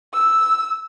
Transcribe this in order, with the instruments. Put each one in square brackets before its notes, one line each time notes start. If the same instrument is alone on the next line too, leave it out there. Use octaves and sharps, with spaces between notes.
[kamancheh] E6